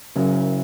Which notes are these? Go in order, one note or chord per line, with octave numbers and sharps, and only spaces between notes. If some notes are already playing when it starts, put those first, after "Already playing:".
F#1 F#2 C#3 F#3